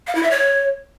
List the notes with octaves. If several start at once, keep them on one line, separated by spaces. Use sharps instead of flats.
F5
E4
E5
C#5